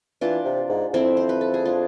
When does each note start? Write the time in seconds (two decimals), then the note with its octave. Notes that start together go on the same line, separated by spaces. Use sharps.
0.21 E3 D4 F4
0.45 C3
0.69 G#2
0.93 F2 C4 E4
1.17 C5
1.29 B4
1.41 A4
1.54 G#4
1.65 D4 F4